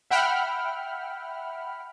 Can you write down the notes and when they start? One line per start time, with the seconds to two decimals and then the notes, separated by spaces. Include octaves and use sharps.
0.10 E5 F#5 G5 B5 F6